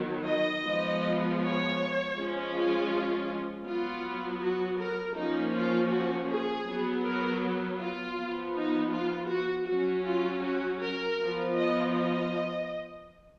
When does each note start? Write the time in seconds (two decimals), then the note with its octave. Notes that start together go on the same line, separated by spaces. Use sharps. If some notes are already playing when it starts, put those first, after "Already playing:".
Already playing: D#3 F#3 B3
0.27 D#5
0.65 F3 G#3 B3
1.41 C#5
2.16 F3 G#3 C#4
2.53 F4
3.66 F#3 B3 F4
4.41 F#4
4.79 A#4
5.16 F3 A#3 C#4 D#4
5.54 F4
5.91 F#4
6.30 G#4
6.67 F#3 B3
7.04 A#4
7.80 F4
8.18 F3 B3
8.55 D#4
8.93 F4
9.29 F#4
9.67 F#3 C#4 F#4
10.06 F4
10.43 F#4
10.80 A#4
11.18 F3 B3
11.56 D#5
11.93 D#5